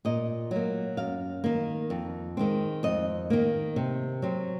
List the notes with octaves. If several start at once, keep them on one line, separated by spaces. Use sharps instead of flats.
A#2 D#5
F#3 A#3
F#2 F5
D#3 A#3
F2
D#3 G#3 C4
F2 D#5
D#3 A#3
C3
F#3 C4